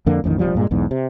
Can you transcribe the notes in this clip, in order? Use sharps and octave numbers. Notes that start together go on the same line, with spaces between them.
F2 D3 A#3
A1 F2 B2 D#3
D#1 E2 F3 G3
G2 A#2 G#3
B1 E2 G#2
C3